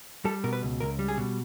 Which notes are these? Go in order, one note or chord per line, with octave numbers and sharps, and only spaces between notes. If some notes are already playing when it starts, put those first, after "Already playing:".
G3 A4
B2 A#4
B4
C#2
C#2 A#4
G3
G#4
B2